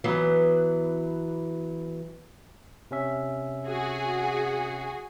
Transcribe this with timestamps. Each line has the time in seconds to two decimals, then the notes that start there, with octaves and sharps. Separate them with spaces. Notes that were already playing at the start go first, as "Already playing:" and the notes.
0.04 E3 F#3 B3
2.91 C3 C#4 E5
3.66 F#4 G#4